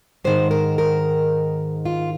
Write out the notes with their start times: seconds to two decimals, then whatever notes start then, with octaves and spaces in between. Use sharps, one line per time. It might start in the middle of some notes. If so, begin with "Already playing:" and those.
0.24 G#2 D#3 G#3 C5
0.51 A#4
0.78 A#4
1.85 F4